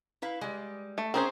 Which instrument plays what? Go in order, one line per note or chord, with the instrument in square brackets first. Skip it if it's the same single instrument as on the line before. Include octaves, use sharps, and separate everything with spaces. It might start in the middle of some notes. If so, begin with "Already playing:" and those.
[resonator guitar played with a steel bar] E4 B4 F5
G3 G#3
[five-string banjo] A3
[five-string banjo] C4 G#4 C5 [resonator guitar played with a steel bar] C#4 A#4